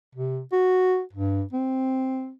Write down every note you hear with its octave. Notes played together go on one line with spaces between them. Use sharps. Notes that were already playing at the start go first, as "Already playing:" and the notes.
C3
F#4
G2
C4